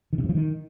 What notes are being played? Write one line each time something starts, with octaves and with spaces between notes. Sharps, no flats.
D#3
C3
G2
F3
D#3